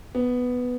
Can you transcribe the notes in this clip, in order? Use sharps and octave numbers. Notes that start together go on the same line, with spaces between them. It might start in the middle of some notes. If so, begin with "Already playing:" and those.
B3